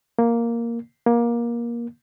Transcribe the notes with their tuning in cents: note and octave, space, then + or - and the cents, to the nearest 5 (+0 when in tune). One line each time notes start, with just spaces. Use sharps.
A#3 +0
A#3 +20